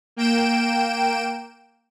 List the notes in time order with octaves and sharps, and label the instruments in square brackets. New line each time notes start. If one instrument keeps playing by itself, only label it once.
[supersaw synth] A#3 G5 D7 E7